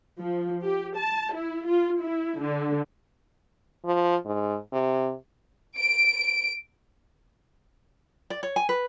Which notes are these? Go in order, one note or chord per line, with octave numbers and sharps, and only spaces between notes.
F3
G4
A5
E4
F4
E4
D3
F3
G#2
C3
D7
D5
C#5
G#5
B4